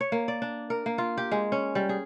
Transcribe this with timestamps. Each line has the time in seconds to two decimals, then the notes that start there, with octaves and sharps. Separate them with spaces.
0.01 C#5
0.12 A#3
0.28 D5
0.42 D4
0.70 A#4
0.86 A#3
0.98 F4
1.18 G4
1.32 G#3
1.52 C#4
1.75 G3
1.89 G#4